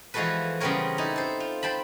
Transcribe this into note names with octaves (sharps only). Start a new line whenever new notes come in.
E3 F3 G#3 F#4 A4 B4
C#3 G3 B3 C4 A#4 C#5
D#4 E4 A4
A4 C5
F4
C5 G5 A5 B5